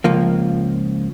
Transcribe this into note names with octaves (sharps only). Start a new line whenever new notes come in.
C#2 F3 A#3